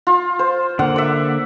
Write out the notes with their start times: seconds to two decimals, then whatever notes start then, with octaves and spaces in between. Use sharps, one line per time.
0.07 F4
0.39 C5
0.79 D3 A#3 F#5
0.96 D5 E5